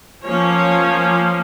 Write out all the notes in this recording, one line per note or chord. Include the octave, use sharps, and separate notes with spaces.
F3 A#3 C#4 C#5